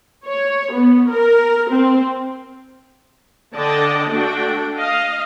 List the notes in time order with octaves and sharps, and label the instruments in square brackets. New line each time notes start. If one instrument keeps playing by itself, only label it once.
[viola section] C#5
B3
A#4
C4
D3 D5 D#5 G5 A5
A3 D4 F#4 A4 G5
D#5 F5